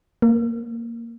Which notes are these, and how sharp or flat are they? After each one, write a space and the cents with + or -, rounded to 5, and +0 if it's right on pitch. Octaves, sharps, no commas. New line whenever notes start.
A#3 -10